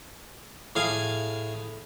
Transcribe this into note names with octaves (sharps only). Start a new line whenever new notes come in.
A2 G#4 F5 G#5